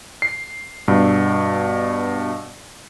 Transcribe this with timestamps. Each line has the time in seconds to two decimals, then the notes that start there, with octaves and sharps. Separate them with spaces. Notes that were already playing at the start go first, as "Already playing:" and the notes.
0.22 C7
0.88 G2 B2